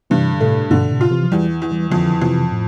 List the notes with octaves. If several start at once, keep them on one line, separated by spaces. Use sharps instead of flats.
G2 C3 E3
D3
A2 C3 A3
G2 B2 D3
A2 C3
F4
C3 E3
F3
E2 E3 G3
E2
E3 G3
F2 D3 F3
F2 C3 E3
A2